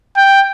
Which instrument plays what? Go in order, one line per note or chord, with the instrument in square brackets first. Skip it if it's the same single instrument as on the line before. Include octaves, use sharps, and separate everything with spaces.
[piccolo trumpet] G5